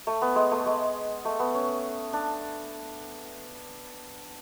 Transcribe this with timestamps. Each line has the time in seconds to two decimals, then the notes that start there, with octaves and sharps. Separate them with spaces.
0.07 A3
0.22 B3
0.36 G#3
0.51 A3
0.66 G#3
1.25 A3
1.40 B3
1.55 C#4
2.13 D4